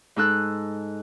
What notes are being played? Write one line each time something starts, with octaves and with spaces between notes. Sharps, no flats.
G#2 D#4 A4 E6 F#6